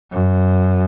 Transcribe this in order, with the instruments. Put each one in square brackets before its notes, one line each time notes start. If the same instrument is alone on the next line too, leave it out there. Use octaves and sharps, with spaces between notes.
[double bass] F#2